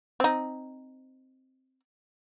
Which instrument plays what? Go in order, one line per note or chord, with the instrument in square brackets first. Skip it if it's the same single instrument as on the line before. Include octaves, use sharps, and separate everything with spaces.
[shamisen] C4 D#4